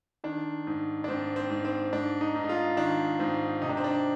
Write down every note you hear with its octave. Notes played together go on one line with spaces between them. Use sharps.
D#3 D4
G#2
D4
G#2 C4
C4
G#2
C4
G#2 D4
D#4
G#2
D#4
F4
D#3 D4
G#2 C4
C3 D#4
D4
C4
D4